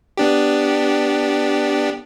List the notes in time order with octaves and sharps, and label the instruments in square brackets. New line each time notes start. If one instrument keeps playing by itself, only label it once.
[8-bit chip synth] B3 D4 G4